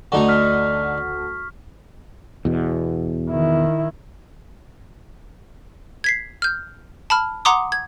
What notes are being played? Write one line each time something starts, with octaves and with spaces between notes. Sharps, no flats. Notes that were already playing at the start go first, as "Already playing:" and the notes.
D2 D3 D#4 A4 F#5 A#5 C#6
F6 B6
E2 B2
D#3 E4
G#6 B6 C7
F6 G6
A5 B5 F6
F#5 A#5 C6 D6 D#6
G#6